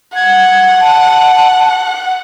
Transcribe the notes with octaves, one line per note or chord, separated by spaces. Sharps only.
F#5 G#6
A5